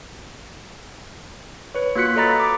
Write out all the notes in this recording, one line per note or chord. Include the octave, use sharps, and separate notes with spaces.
B4 C#5
A#3 F4 F#4 F#6 B6 C#7
A4 C#5 D#5 A#5 B5 A6
D6